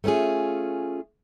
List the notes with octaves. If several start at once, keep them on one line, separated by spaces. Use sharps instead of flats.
A3 B3 C#4 F4 G#4